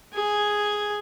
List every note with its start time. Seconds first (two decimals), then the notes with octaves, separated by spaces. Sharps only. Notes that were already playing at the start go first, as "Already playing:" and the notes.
0.14 G#4 G#5